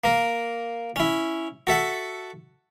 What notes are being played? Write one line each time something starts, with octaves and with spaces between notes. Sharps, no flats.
A#3 A#4
C#4 E4
F#4 A4 E5 F#5